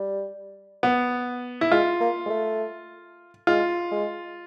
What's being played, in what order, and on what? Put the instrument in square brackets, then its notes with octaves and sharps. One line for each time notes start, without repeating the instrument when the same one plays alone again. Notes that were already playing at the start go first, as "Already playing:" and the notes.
Already playing: [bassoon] G3
[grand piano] B3
E4
[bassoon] G#3 [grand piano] F4
[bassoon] A#3
G#3
A3
[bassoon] G#3 [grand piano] F4
[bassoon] G#3